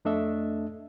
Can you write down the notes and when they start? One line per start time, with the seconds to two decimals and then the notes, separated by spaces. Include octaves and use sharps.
0.05 F2 A3 D4 A4 D#5 E5